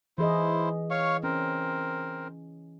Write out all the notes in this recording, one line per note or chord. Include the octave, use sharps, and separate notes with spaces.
E3 E4 G#4 C5 D#5
C#5 F5 C#6
C4 C#4 A#4